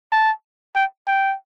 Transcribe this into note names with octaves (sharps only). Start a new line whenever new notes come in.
A5
G5
G5